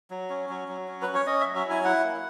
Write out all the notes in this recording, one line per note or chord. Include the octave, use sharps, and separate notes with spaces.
F#3
C#4
F#3
F#3
C#4
B4
C#4
C#5
C#4 D#5
F#3 E5
E5
E4 G#5
E4 F#5
A#3